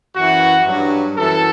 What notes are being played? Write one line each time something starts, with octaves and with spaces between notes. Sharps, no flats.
F#2 E3 F#4
G2 F#3
F#2 E3 A4